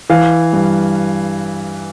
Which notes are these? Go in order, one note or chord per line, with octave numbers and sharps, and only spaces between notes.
E3 F5
G2